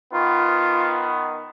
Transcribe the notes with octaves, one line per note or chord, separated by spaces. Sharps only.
D#3 B3 F4